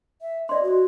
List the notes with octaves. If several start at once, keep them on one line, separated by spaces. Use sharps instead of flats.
E5
D5 D#5 C6
F#4